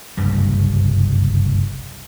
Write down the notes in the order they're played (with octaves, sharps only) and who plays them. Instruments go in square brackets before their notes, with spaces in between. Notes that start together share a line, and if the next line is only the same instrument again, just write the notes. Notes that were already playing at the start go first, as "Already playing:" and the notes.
[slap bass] F#1 C2 G2 G3